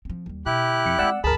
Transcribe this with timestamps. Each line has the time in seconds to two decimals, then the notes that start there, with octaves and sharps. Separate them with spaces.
0.05 F3 C4
0.26 D#2 G3
0.46 B2 D3 E4 G4 F#6
0.86 F2 C#7
0.99 G#3 C4 D5 F#5 E6
1.24 G#1 D2 G#4 A#4 A5 B5